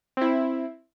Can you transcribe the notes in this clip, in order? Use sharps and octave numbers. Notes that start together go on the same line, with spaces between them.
C4 E4